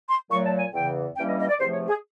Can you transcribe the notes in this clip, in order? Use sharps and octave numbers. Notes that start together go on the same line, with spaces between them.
C6
A#2 F#3 A3 C#6
A5
G#5
E2 C#3 E3 G5
G2 E3 G3 A#3 C#4 G5
D#5
D#5
D5
E2 C3 F3 A3 C5
C#5
G#4